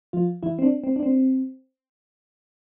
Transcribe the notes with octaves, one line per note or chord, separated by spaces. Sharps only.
F3 F4
E3 E4
C4
D4
C4
D4
C4